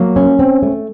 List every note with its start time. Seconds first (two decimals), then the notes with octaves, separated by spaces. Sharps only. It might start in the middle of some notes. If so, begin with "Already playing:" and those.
Already playing: F#3 A#3
0.16 C#4
0.39 C4
0.63 A3